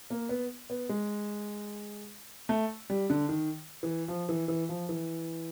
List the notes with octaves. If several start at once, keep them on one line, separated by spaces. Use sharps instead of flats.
A#3
B3
B3
G#3
A3
G3
D3
D#3
E3
F3
E3
E3
F3
E3